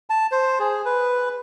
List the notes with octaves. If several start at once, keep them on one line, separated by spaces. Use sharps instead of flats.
A5
C5
G#4
B4